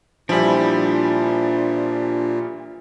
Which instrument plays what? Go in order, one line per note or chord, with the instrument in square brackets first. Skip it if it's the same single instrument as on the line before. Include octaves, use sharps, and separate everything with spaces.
[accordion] A#2 [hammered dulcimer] E3 E4 G5 [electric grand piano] F3 G3 [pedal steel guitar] D4 B5